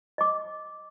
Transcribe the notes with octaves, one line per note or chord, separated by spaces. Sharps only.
D#5 D6